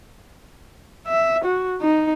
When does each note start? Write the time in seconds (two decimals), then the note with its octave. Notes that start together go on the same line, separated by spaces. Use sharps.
1.07 E5
1.44 F#4
1.82 D#4